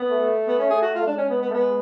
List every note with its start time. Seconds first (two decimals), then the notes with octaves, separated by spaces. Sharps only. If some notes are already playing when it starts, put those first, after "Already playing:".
Already playing: B3
0.11 A3
0.48 B3
0.58 C#4
0.70 G#4
0.82 F#4
0.95 F4
1.06 G#3 D4
1.18 C#4
1.30 B3
1.42 B3
1.50 A3
1.54 B3